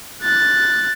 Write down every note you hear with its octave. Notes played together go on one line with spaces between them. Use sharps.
F#6 A6